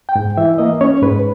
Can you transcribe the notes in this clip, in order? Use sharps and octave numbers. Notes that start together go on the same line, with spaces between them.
G5
G#2
E3 E5
A#3 D#5
C#4 C#5
G#2 B4